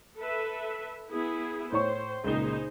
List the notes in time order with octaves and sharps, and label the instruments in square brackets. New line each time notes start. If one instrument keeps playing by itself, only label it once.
[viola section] A4 B4 E5
B3 E4 G#4
[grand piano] A2 C#5 C#6 [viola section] C5
[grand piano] C#2 A#2 G7 [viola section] D#4 G#4 C5